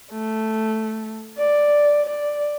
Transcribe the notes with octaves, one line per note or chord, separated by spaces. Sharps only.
A3
D5
D5